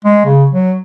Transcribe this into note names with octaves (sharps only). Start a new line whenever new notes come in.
G#3
C#3
F#3